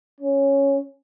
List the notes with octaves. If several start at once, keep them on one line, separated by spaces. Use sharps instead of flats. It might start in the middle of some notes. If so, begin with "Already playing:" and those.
C#4